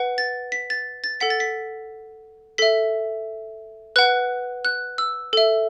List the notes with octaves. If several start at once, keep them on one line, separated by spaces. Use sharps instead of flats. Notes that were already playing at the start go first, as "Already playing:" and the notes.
Already playing: B4 F#5
A6
B6
A6
A6
A4 F#5 B6
A6
B6
A4 E5 B6
B4 F#5 F#6
F#6
E6
A4 E5